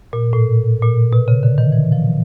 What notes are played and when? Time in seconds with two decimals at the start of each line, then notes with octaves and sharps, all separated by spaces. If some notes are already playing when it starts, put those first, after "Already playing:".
0.13 A#2
0.33 A2
0.83 A#2
1.13 B2
1.28 C#3
1.43 D3
1.58 D#3
1.72 E3
1.92 F3